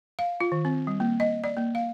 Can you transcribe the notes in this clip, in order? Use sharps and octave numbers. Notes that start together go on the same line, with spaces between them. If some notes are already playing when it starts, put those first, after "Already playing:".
F5
F4
D#3
C4
G3
A#3
D#5
D5
A#3
F5